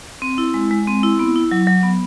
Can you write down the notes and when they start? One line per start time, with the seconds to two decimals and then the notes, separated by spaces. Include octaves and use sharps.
0.22 C4
0.38 E4
0.54 G#3
0.71 G#3
0.87 C4
1.03 E4
1.19 B3
1.36 E4
1.51 F#3
1.67 F#3
1.83 B3